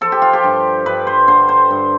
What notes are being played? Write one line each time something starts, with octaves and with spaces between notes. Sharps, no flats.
F3 A4
G4
F4
G4
G2
G2 B4
C5
D3 C5
C5
G2